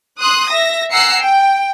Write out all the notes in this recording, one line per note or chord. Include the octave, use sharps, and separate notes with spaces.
C6 D#6 F#6
E5 A#6
F#5 G#5 A#5 E6 C7 C#7
G5